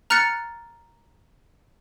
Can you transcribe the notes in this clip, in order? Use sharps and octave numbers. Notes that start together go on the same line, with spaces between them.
A#5 F6 F#6 A6 C#7